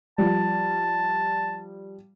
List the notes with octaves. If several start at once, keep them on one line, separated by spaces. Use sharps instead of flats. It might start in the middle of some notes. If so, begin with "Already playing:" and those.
F3 G3 A5